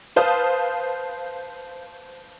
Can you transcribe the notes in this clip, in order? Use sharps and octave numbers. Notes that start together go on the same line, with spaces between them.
B4 C5 F5 A5 D#6